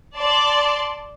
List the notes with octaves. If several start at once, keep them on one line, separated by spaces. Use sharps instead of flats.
D5 A5 C6